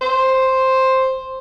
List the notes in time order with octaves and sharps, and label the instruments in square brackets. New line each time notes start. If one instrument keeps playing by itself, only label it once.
[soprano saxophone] C5